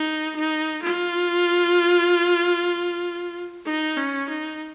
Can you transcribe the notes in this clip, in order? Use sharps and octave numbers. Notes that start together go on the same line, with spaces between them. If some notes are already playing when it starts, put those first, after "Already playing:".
Already playing: D#4
D#4
F4
D#4
C#4
D#4